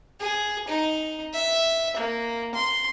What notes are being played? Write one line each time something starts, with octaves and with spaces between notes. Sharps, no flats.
G#4
D#4
E5
A#3
C6